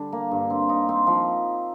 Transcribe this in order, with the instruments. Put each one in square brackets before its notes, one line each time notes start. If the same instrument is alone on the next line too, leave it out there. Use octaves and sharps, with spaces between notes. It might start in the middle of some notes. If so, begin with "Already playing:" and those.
Already playing: [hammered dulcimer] D3 G3 D4
A#3
G2
C4
D#4
C4
F3